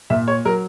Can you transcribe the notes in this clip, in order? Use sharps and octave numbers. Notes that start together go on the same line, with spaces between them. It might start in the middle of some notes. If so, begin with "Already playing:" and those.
A#2 E5
C#5
F#3 A#4